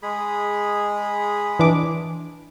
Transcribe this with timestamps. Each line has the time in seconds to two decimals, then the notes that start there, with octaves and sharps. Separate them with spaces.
0.03 G#3 G#4 B5
1.59 E3 D4 D6